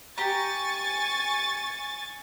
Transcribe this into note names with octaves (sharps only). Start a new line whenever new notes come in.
G4 G#5 A#5 C#6 A6